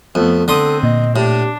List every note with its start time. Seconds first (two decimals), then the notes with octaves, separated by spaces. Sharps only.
0.15 F2 A3 B3 A4
0.48 D3 C4 A4 C6 D#6
0.83 A#2 D#5
1.16 A2 D4 G4